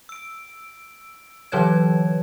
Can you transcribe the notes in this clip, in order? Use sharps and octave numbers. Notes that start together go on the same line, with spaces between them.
E6 D7
D3 E3 F#3 B4 C#5 G#6